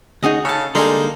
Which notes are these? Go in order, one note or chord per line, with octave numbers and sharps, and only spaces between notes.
D2 C#4 D#4 F#4 G#4 D#5
C#3 A4 C#5 A5
D3 G3 G#3 A#3 D#4 A4 G#5 C6